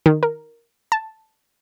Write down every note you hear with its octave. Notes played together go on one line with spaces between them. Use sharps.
D#3
A#4
A5